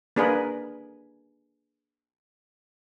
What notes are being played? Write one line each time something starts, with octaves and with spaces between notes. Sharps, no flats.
A#3 D4 G#4 A#4 B4